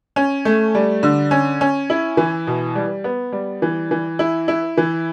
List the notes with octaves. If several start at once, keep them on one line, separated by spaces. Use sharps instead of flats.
C#4
A3
G3
D3
C#4
C#4
E4
E3
B2
G3
B3
G3
E3
E3
E4
E4
E3